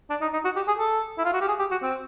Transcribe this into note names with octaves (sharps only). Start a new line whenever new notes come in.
D4
D#4
D#4
F#4
G4
G#4
A4
E4
F4
F#4
G4
G#4
G4
F#4
C4